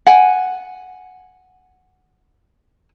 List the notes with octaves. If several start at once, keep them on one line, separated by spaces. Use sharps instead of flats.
F#5 G#5